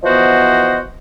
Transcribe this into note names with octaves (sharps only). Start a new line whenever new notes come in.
E3 F3 B3 F#4 C5 D#5